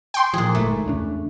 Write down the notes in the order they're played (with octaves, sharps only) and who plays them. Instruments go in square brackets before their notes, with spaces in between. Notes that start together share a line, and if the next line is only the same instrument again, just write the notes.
[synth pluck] G5 C6
[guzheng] A#2 G#4 [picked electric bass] F3
[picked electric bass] G1 G#2 [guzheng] A3
[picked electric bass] E2 C#3 D4